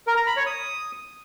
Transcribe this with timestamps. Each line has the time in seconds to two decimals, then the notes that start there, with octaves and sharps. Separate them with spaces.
0.07 A#4
0.17 A#5
0.27 B5
0.37 C#5
0.47 D#6